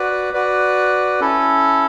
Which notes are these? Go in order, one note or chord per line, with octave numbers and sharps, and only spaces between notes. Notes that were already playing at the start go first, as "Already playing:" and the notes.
Already playing: F#4 B4 D5
F#4 B4 D5
C#4 E4 A4